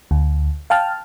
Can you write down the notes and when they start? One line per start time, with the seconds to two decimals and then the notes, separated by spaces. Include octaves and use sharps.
0.11 D2
0.70 F5 G5 A5 F6